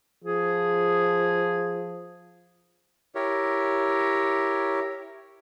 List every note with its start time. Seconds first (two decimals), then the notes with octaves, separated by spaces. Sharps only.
0.24 F3 G#4
3.15 E4 G4 A#4 C#5